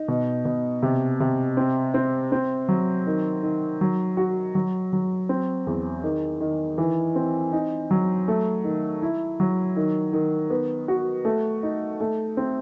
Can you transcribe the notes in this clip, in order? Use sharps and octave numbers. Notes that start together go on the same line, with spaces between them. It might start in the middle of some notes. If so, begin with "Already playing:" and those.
Already playing: D#4
B2
B2
C3
C3
C4
C4
C4
F#3
D#3
D#3
F#3
F#4
F#3
F#3
C4
E2
D#3
D#3
E3
C4
D#4
F#3
A3
D#3
E4
F#3
D#3
D#3
B3
F#4
A3
D#4
A3
C4